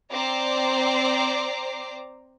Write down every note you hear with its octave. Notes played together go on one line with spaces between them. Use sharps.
C4 C5 D5 A#5 D6 C7